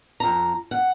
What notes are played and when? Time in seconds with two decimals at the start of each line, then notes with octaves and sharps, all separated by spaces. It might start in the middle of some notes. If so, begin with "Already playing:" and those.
0.20 F2 A#5
0.71 F#5